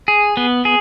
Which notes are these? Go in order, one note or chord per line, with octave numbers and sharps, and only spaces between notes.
G#4
B3
G#4